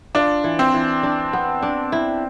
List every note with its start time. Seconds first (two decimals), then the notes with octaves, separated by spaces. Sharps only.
0.15 D4 F4
0.44 E3
0.59 C4
0.74 E3
1.03 D4
1.33 B3
1.63 D4
1.92 E4